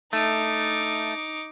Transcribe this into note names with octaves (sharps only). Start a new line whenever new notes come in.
A3 D#4 D6